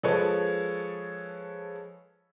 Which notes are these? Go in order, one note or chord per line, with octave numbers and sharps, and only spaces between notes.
F3 G#3 A4 B4 C#5